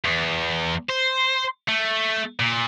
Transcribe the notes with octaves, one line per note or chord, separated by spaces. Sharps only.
E2
C5
A3
A#2